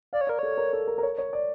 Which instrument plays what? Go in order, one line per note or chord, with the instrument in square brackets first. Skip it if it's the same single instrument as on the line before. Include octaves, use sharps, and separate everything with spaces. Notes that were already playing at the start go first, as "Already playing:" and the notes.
[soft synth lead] D5 [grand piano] F5
[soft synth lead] C#5
[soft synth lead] A#4 [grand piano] D5
[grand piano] A4 [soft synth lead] C#5
[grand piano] A#4
A4
A#4
A#4
C#5
C#5
D5